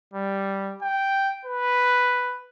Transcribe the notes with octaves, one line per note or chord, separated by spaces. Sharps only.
G3
G5
B4